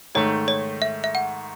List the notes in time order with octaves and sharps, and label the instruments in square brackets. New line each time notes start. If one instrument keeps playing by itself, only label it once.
[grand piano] G#2 D#3 A3 [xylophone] C#5
[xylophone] C#5
E5
E5
F#5